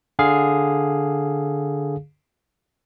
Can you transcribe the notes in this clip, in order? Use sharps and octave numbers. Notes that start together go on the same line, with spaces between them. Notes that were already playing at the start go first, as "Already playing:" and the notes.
D3 G#4 F5